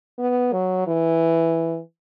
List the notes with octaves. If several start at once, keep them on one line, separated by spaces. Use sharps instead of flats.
B3
F#3
E3